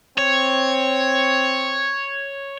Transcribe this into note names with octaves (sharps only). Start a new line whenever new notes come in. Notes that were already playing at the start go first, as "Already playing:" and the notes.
C4 C#5